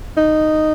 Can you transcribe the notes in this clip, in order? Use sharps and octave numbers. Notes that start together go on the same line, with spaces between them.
D#4